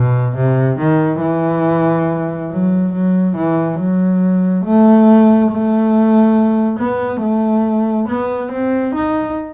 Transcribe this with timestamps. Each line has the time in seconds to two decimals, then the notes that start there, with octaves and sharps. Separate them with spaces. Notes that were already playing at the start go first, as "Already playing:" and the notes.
Already playing: B2
0.36 C3
0.79 D#3
1.21 E3
2.50 F#3
2.93 F#3
3.36 E3
3.79 F#3
4.65 A3
5.51 A3
6.79 B3
7.22 A3
8.08 B3
8.52 C4
8.94 D#4